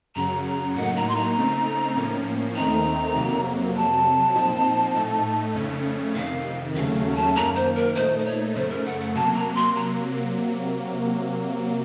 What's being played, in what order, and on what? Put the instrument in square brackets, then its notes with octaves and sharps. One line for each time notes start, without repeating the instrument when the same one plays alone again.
[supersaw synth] F#2 C#3 F#3 [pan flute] A#5
[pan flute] A#5
[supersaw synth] A2 F#3 A#3 D#4 [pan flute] F#5
[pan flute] A#5
C6
A#5
[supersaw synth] C#3 A3 C4 D#4
A2 F3 A#3 C#4
[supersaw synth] D#2 D#3 A3 C4 D#4 [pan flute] A#5
[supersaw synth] F2 C3 F#3 A#3
[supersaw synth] F2 C3 F#3 [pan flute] A5
[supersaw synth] A#2 F3 C4 D#4
A2 A3 D#4
F2 C#3 A3 C#4
[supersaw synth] F2 C3 D#3 [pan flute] F5
[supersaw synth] D#2 C#3 F#3 A3 C#4 [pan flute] F5
[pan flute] F5
A#5
A5
[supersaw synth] F#2 D#3 A#3 [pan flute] A#5
[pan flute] C5
A#4
[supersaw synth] A#2 A3 D#4 [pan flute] C5
[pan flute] C5
C#5
[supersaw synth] F#2 C#3 A3 [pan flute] C5
[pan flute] A#4
F#5
F#5
[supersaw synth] C3 F#3 A#3 [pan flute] A5
[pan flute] A#5
C6
A#5